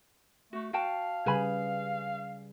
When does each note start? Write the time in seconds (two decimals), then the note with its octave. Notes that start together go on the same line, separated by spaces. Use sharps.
0.53 A3 F#4
0.73 F#4 F5 G5 A5
1.26 C#3 G3 G#4 B4 G#5 B5